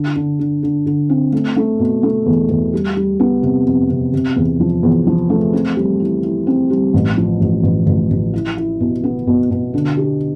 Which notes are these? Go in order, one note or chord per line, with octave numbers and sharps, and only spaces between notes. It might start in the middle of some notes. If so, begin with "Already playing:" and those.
Already playing: D3
D3
D3
D3
D3
C4
A3
A3
B2
A3
E2
E2
G3
G3
B3
C3
F2
C3
C3
E2
F3
E2
F3
A3
C4
G3
E4
E4
C4
G3
A1
F3
A1
A1
A1
A1
E4
E4
B2
B3
B2
B2
D3
G4